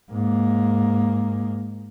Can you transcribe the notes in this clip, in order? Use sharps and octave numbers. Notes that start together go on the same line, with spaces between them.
G#2 A#3